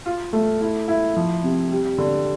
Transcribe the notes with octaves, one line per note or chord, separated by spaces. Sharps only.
F4
A3
E4
E4
F3
C3
G3
D3